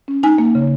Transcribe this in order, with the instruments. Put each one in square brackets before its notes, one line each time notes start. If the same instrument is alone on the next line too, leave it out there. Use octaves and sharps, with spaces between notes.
[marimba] C#4
D#4 G#5
A#3
C#3